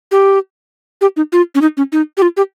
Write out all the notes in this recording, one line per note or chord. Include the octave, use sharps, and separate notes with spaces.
G4
G4
D#4
F4
C#4
D#4
C#4
D#4
G4
F4
G4